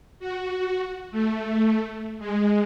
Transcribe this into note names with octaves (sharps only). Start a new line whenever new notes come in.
F#4
A3
G#3